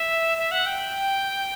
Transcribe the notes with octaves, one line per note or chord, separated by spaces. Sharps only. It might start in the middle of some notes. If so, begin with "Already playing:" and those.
Already playing: E5
E5
F#5
G5